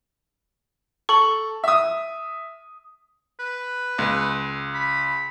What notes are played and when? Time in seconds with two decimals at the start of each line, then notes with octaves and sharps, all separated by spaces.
1.09 A4 C#6 F#7
1.64 E5 D#6
3.40 B4
3.98 C#2
4.74 B5